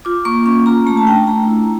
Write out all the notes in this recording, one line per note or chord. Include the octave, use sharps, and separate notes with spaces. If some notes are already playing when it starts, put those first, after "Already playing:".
F4 D6
A#3 C#6
C#4 C#6
F4 A#5
A3 A#5
A5
D4 G5
A3 A#5
E4